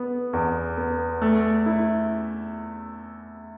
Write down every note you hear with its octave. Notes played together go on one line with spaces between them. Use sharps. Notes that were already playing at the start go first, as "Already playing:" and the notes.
Already playing: B3
E2
B3
A3
E4